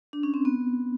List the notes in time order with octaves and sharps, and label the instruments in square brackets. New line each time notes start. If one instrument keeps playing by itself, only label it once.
[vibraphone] D4
C#4
C4
B3